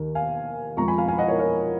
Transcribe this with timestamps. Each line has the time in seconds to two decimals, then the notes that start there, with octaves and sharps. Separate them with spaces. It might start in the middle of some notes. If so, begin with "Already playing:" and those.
Already playing: D#2 D#3 D#4 A#4
0.15 F5 G#5
0.77 F2 F3 G#3 A#5 C#6
0.88 G#5 B5
0.98 F5 G#5
1.08 F5 G#5
1.18 D#5 F#5
1.28 A#4 C#5
1.39 A#4 C#5